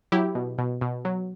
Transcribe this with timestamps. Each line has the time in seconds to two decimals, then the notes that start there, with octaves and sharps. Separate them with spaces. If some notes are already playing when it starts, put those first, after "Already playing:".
0.12 F#3 E4 G4
0.35 B2
0.58 B2
0.81 B2
1.05 F#3